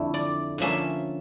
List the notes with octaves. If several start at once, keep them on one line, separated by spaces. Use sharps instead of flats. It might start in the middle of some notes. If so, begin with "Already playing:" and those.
Already playing: F2 D3 A3 E4
D5
D3 F3 A#3 C#4 E5